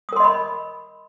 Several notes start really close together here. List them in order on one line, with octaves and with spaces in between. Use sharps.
D#6 A#4 C6 D#5 B5